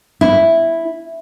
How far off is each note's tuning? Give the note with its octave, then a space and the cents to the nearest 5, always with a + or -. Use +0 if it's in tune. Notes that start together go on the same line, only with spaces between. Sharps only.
E4 +0